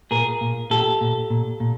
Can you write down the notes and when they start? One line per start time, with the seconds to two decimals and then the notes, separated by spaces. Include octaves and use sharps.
0.11 A#2 G#4 A#4
0.41 A#2
0.70 A#2 G4 A4
1.01 A#2
1.30 A#2
1.60 A#2